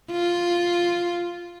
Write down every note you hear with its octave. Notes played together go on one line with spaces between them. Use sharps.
F4